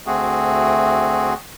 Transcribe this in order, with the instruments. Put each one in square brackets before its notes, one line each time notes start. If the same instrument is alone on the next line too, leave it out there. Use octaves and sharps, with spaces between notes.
[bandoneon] D2 A3 C4 F#4 G#4